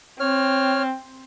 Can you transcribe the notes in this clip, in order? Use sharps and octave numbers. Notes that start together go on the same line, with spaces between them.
C4 C#5 F6